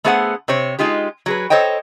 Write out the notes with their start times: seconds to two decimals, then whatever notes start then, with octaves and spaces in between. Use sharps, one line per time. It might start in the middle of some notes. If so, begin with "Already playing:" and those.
0.04 A3 B3 G#4 C5 D#5 F#5
0.48 C3 C5 C#5
0.79 G#3 D#4 F4 G4
1.26 F#3 G#4 B4
1.50 A4 C5 C#5 D#5 G5